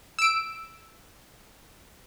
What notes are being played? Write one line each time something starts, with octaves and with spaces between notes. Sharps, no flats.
E6 D7